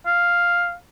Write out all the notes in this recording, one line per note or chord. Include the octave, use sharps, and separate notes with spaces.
F5